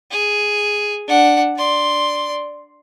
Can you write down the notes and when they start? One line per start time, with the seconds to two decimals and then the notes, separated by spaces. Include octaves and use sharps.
0.11 G#4
1.07 D4 F#5
1.56 D5 C6